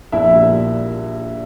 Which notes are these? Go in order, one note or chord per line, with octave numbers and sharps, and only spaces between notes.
A#1 E4 E5
A#2 G3